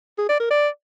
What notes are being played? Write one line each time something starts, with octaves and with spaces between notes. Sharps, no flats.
G#4
D5
A#4
D5